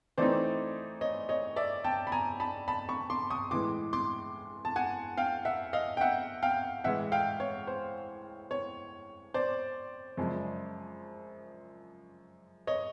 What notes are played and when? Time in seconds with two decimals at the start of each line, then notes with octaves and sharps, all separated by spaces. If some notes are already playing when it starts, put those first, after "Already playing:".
0.18 E3 A3 C4 D#4 C5 D5
1.01 C#5 D#5
1.29 C#5 D#5
1.56 D5 E5
1.84 G5 A5
2.07 B5
2.12 G#5 A#5
2.40 A5 B5
2.68 A5 B5
2.89 B5 C#6
3.10 C6 D6
3.30 C#6 D#6
3.51 A2 E3 G#3 C6 D6
3.93 C6 D6
4.65 A5
4.76 F#5 G#5
5.17 F5 G5
5.45 E5 F#5
5.73 D#5 F5
5.97 G5
6.01 E5 F#5
6.43 F5 G5
6.84 A2 E3 G#3 E5 F#5
7.12 F5 G5
7.40 C#5
7.67 C5
8.51 C#5
9.34 C5 D5
10.17 F#2 C#3 F3 G#3
12.67 C#5 D#5